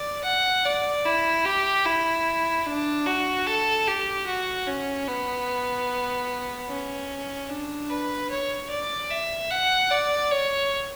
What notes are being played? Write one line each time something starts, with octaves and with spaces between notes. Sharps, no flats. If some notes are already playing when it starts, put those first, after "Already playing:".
Already playing: D5
F#5
D5
E4
G4
E4
D4
F#4
A4
G4
F#4
C#4
B3
C#4
D4
B4
C#5
D5
E5
F#5
D5
C#5